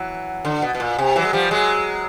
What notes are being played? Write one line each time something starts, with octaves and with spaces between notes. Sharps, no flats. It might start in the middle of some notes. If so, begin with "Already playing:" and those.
Already playing: E3 F#3
D3
B2
B2
A#2
C3
E3 F#3
G#3
F3 G3
F#3 G#3